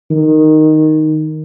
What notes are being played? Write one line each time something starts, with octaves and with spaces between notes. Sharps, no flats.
D#3